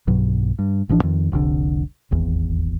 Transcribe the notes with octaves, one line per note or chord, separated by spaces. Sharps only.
B1 G2 B2 F#3
G2
A1 E3 F3 D4
F2 D#3
F1 C2 A#2 D3
D#1 G#1 E2